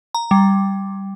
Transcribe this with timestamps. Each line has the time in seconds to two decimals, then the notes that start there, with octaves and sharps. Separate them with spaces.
0.14 A#5
0.31 G3